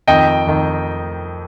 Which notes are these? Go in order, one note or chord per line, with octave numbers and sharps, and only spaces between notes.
F2 D#3 D#5 G5
F2 D#3